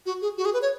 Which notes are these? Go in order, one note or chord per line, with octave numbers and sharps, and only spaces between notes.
F#4
G#4
F#4
G#4
B4
C#5